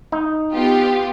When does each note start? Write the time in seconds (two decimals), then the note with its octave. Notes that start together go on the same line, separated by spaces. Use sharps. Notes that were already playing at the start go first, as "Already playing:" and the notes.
0.12 D#4
0.52 B3 F4 G4